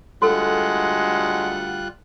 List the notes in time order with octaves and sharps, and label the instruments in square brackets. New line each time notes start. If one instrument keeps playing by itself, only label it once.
[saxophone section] D2 F#5 [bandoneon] G3 F4 F#6 [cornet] G#3 [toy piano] F#4 A4